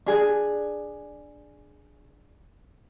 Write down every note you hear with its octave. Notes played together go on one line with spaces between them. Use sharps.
D4 G#4